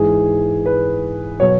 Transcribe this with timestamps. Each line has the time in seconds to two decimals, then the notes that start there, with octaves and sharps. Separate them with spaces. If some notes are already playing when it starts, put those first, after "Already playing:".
Already playing: G#2 E3 G#4
0.66 B4
1.40 B2 F#3 C#5